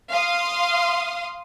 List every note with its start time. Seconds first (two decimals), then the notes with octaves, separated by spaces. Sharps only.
0.11 F5 C6 D#6